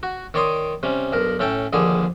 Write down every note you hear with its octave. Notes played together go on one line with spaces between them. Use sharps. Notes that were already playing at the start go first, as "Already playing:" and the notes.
F#4
D#3 C#5 D5 C6 D6 D#6
C3 G3 C#4
B1 G2 A#4
A2 C#4 A4 G5
A#1 D#2 D3 G3 G#4